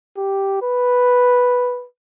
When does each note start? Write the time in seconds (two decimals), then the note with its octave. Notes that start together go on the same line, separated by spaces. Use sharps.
0.17 G4
0.62 B4